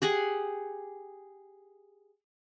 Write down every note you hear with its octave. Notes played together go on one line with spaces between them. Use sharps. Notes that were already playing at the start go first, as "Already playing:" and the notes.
G4 G#4 F#5 G#5